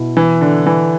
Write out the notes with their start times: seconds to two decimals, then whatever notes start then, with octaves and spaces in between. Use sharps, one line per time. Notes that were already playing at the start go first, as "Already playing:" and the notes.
Already playing: B2 E4
0.17 E3
0.41 D3
0.66 E3